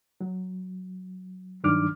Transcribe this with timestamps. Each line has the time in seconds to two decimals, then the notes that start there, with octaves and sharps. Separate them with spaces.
0.21 F#3
1.64 G2 D#3 F#3 D4 D6 F6